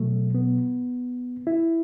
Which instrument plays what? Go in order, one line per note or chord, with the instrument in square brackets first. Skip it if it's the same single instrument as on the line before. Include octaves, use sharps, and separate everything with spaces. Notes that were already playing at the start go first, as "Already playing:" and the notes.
Already playing: [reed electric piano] B2 F#3 A3
B3
E4